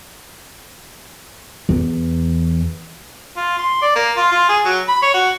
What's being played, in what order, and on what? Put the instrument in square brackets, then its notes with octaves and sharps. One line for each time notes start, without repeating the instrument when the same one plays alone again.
[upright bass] E2
[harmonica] F4
C6
D5
A#3
F4
F4
G#4
F#3
B5
C#5
F#4